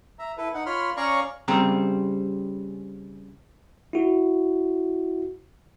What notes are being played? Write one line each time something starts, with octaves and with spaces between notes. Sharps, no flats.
E5 A#5
E4 A4 B4
D#4 F#5
F4 C#5 B5 C6 F6
C#4 C#5 D5 F5 A#5 C#6
C#3 G3 C4 A#5
E4 F#4